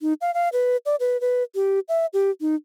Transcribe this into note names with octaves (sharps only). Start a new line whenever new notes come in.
D#4
F5
F5
B4
D5
B4
B4
G4
E5
G4
D#4